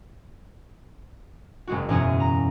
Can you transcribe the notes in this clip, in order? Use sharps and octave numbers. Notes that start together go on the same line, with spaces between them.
F#1 G#3 F#4
E1 F#2 C#4 C#5 D#6
A#5